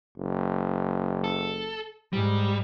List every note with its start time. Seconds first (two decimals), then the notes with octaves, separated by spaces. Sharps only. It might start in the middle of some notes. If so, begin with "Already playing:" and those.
0.17 F#1
1.24 A4
2.13 G#2 G3